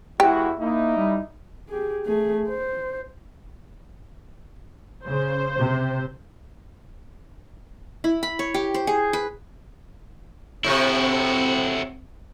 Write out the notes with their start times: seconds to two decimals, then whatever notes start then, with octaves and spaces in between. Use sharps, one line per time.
0.20 E2 G#3 E4 F#4 G4
0.59 A#3 D#4 E4
0.96 G3
1.69 G4 G#4
2.06 A3 G#4
2.49 C5
5.04 C#3 C5
5.56 C3
8.04 E4
8.23 B5
8.39 C#5
8.54 G4
8.74 C5
8.87 G#4
9.13 B4
10.64 A2 C3 C4 E4 F#4